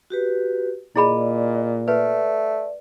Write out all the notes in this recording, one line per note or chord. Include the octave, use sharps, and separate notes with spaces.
F#4 G4 B4
A#2 E4 G#4 D5 D#5 B5
A3 B4 D5